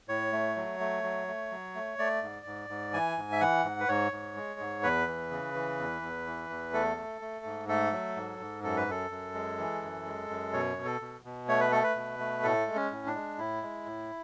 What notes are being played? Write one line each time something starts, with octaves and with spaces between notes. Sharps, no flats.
A2 C#5
A3
F#3
A3
F#3
A3
F#3
A3
A3 D5
G#2
G#2
G#2
E3 G#5
G#2
E5
E3 F#5
G#2
B4
G#2 C#5
G#2
G#3
G#2
E2 B4
E3
C#3
E3
E2
E2
E3
E2
A3 A4
A3
A3
G#2
A3 A4
F#3
G#2
G#2
F#2 A4
B4
F#2 A4
F#2
G#3
E3
F#2
G#3
F#2
B2 C#5
B2
A4
B2
B2
A3 C#5
B4
A3 A4
B4
B2
A3
A2 A4
G#3
C#4
A2
D4
G#3
A2 E4
G#3
A2